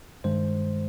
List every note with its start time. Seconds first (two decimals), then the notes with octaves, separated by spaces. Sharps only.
0.24 G2 D#3 G#3 C5